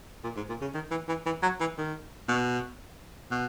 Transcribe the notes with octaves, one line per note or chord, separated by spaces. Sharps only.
A#2
G#2
A#2
C#3
D#3
E3
E3
E3
F#3
E3
D#3
B2
B2